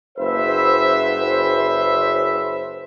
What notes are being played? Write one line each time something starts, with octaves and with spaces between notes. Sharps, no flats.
F#1 B4 C5 E5